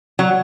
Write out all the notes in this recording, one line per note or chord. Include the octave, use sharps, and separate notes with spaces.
F#3